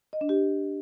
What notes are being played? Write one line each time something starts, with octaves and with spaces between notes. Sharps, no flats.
D#5
D4
G4